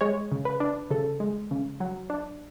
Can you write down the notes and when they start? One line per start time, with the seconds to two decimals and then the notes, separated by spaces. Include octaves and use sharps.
0.01 G#3 C#5
0.32 C#3
0.45 B4
0.60 D4
0.91 C#3 A4
1.20 G#3
1.51 C#3
1.80 F#3
2.10 D4